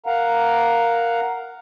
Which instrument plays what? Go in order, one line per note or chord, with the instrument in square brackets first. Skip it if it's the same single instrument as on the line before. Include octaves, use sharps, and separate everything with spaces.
[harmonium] A#4 F5 F#5 A#5